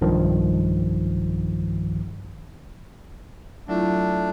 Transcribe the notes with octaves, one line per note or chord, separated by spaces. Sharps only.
B1 G2 D#3 F3
F#3 A3 D4 E4 F4